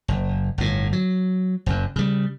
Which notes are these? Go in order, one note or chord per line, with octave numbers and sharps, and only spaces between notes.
F#1
G1 A2
F#3
F#1 F#2
C#3 G3